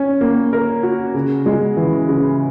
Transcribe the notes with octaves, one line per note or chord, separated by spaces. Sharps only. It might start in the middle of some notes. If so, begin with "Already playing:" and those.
Already playing: C#4
A#3
A#4
F#4
C#3
G#3
E3
C#3